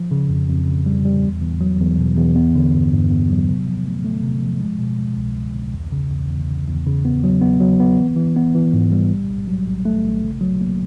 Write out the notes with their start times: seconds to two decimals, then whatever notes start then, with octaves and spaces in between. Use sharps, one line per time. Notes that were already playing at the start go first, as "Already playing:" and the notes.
Already playing: F3
0.11 C#3
0.29 F2
0.49 F2
0.67 C#3
0.86 G3
1.05 G3
1.23 E2
1.42 E2
1.61 F#3
1.80 E2
1.99 B2
2.17 E2
2.36 B3
2.55 D3
2.74 G2
2.92 G2
3.11 B3
3.30 F#3
3.49 C3
3.67 F3
3.86 A3
4.04 A3
4.23 C3
4.42 F3
4.61 G#3
4.79 B2
4.99 G#3
5.17 C2
5.36 C2
5.55 C2
5.74 E2
5.92 C#3
6.11 E2
6.30 E2
6.48 C#3
6.67 E2
6.86 C#3
7.05 B3
7.24 F#3
7.41 B3
7.60 F#3
7.80 B3
7.98 E3
8.16 E3
8.36 B3
8.55 E3
8.73 G#2
8.92 G3
9.11 A#1
9.29 A#1
9.47 F#3
9.67 A#1
9.85 A3
10.05 A#1
10.23 C#3
10.41 F#3
10.61 A#3